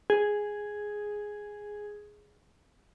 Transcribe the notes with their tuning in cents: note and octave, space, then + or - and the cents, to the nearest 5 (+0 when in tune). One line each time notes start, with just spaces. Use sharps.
G#4 +0